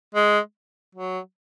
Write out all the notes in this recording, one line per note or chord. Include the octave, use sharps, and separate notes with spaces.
G#3
F#3